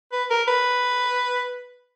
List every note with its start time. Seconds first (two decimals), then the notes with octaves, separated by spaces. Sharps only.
0.12 B4
0.30 A#4
0.48 B4